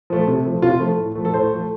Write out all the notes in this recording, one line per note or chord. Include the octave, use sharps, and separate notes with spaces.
F3 A3
C3
F3 A3
C3 F4
F3 A3
A2
F3 A3
A4
A2 C5
F3 A3